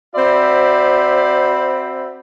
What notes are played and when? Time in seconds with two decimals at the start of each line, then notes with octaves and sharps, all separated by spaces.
0.15 C4 F#4 C5 D5 E5 B5